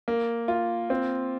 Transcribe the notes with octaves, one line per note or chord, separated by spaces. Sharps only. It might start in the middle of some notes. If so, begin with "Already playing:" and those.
A#3
F4
C4